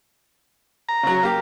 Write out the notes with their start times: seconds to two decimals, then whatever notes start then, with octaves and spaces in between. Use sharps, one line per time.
0.89 A#5
1.03 C#3 F#3
1.23 A#3 G4